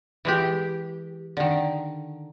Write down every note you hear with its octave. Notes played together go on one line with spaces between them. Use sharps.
E3 G#3 G4
D3 D#3